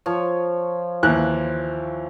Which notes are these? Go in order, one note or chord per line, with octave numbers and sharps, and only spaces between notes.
F3 C#5
D#2 E3 F#6